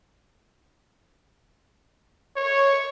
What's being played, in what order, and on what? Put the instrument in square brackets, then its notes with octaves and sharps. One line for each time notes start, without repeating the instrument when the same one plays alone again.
[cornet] C#5